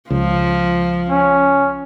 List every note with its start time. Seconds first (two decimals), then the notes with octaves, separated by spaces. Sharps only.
0.10 C#2 F3
1.09 C#4